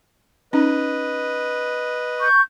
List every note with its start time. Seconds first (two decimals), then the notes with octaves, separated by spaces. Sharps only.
0.53 C#4 D#4 B4 D#5
2.21 C#6 G6